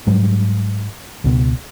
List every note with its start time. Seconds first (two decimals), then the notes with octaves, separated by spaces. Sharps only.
0.07 G#2 F#3 G3
1.24 C#2 B2